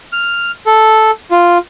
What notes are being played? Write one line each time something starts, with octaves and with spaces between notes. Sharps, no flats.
F6
A4
F4